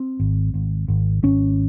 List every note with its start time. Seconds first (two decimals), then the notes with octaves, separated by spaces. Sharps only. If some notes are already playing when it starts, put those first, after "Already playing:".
Already playing: C4
0.20 G#1
0.54 G#1
0.88 G#1
1.23 G#1 C#4